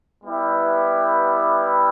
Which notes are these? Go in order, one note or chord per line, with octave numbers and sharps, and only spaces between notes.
G3 B3 E4 G4 B4